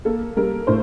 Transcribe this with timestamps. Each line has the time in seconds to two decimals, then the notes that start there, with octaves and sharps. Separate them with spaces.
0.05 A#3 A4
0.37 G3 A#4
0.67 A2 C5